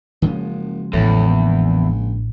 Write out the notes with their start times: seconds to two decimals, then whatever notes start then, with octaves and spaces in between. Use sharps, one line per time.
0.22 F#1 C#3 F3 G#3
0.93 A1 E2 A2
1.28 A#1